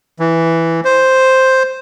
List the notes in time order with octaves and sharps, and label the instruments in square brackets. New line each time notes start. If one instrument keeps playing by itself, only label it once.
[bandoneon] E3
C5